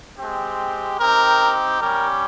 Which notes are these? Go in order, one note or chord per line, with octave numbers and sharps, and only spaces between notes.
G#3 C4 G4
C4 D#4 G4 A#4
G3 C#4 G4 A#4